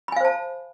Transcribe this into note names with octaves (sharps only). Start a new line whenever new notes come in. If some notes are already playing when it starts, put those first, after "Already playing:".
C5 F5 G#5 A5 B5